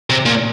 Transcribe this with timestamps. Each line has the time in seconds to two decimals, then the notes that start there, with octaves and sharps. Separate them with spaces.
0.10 C3
0.26 A#2